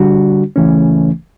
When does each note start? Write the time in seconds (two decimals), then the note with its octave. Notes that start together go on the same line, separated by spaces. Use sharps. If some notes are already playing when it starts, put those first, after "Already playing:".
Already playing: D3 G3 D4 F#4
0.56 C#2 C#3 E3 A3 C#4